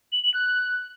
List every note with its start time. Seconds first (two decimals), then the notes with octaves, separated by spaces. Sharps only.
0.12 F#7
0.23 F#7
0.34 F#6